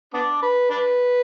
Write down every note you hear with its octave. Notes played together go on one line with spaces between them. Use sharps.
B3 D4
B4
D4 B4